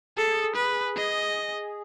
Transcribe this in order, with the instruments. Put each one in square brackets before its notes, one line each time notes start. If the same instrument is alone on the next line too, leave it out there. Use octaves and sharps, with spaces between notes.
[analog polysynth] G#4 [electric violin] A4
[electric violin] B4
[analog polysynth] G#4 [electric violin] D#5